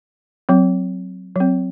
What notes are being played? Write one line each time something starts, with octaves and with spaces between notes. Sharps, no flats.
F#3 C4
F#3 C4